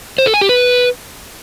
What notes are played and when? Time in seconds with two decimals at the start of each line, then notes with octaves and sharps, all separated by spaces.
0.18 C5
0.26 A4
0.34 G#5
0.41 G4
0.49 B4